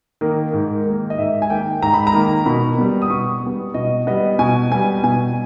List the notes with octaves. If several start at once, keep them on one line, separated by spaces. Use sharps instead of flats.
D#3 A#3
G#2
D#3 A#3
D#5
G#2 E5
G#5
D#3 A#3 G5
G#2 A#5
B5
A#5
D#3 A#3
B2 B5
G3 B3
D#6
B2 C#6
G3 B3
B2 D#5
G3 B3 D#5
B2 G#5
G3 B3 G#5
B2 G#5